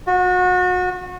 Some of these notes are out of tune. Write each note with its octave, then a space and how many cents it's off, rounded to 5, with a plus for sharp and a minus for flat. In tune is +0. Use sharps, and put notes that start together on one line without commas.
F#4 -30